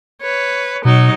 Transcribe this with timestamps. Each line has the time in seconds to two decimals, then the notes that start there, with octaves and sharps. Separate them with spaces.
0.22 B4 C#5
0.85 B2 F#3 D#4